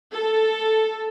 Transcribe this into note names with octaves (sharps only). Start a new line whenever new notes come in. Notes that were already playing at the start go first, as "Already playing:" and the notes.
A4